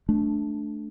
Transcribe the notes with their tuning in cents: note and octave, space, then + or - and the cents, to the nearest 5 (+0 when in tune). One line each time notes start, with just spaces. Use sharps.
A3 -15 D4 +0